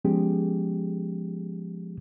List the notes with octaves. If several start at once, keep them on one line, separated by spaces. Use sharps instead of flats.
F3 G#3 B3 C#4 G4 G#4